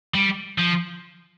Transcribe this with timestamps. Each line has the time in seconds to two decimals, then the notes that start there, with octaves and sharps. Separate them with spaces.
0.15 G3
0.58 F3